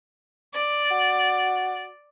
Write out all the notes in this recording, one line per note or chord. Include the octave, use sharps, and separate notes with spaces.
D5
F#4